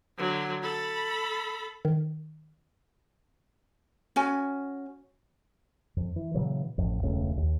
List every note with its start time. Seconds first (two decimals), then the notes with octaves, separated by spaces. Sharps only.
0.18 D3 F#3
0.62 A4 B5
1.85 D#3
4.16 C#4 F#4 G#5
5.97 F2
6.16 E3
6.34 A#2 C#3 E3 F#3
6.78 A1 F2
7.03 E1 C#2 A3 C#4
7.37 D#2